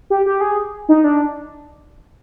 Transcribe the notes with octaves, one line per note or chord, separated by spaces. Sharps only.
G4
G4
G#4
D#4
D4